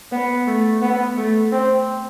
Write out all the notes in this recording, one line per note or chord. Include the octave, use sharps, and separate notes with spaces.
B3
A3
B3
A3
C4